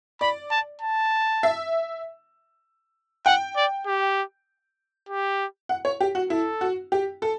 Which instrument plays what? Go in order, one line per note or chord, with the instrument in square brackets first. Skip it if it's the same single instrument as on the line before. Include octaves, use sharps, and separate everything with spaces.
[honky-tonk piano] D5 [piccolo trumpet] B5
[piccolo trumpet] A5
A5
[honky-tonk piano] E5
[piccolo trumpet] F#5 [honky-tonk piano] G5
[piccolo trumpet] D5
G4
G4
[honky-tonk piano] F#5
C#5
G4
F#4
[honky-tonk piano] E4 [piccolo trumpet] A4
[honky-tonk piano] F#4
G4
A4